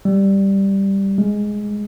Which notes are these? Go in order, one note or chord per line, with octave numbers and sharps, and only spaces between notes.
G3
G#3